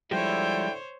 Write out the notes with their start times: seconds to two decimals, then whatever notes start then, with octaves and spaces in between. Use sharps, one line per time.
0.11 D3 F3 G3 G#3 E4 C5 C#5 G5